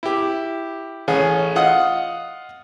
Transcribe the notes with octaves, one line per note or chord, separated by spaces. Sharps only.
E4 G4
A1 C#4 G#4
F4 D#5 F#5 D#6